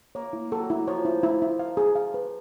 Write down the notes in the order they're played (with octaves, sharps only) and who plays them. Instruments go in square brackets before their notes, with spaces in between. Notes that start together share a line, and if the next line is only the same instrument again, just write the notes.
[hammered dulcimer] A#3 [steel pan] C#5
[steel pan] E4
[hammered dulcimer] F#3 [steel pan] A4
[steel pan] E4
[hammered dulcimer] F3 [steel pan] C#5
[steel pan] E4
E4
E4
F5
G#4
F5
B4